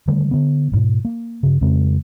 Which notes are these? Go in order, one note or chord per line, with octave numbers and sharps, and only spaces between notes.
D3 D#3 G3 A3
D3 B3
A1 G#2 B2
A#3
G2 C#3
F2 C#3 G#3 C4